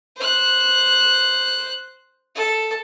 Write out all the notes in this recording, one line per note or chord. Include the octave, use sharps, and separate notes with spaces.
C5 F#6
A4